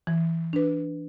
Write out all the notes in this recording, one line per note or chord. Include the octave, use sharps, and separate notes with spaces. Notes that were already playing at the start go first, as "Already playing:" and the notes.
E3
D4 B4